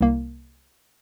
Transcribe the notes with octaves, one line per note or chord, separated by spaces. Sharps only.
C2 A#3